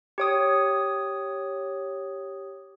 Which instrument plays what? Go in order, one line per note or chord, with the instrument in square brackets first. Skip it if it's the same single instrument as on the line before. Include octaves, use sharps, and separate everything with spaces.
[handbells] G4 C#5 D#6